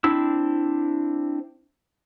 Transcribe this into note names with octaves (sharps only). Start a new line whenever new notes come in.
C4 D4 E4 E6